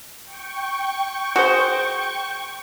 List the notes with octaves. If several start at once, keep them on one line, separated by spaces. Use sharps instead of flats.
G5 C#6
F#4 G#4 C5